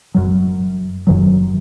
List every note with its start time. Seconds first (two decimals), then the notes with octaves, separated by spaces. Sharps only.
0.14 F#1 F#2 D#3 F#3
1.07 F#1 F#2 D#3 F#3